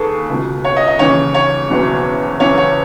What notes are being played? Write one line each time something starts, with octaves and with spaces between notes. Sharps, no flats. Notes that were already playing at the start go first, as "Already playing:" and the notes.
Already playing: D#2 D#3 G#4 A4 B4
C#2 B2
C#5
D#5
D#5
D#2 C#3 E3 C#5
C#5
F#1 E2 B2
F#1 E2 C#3 E3 C#5
C#5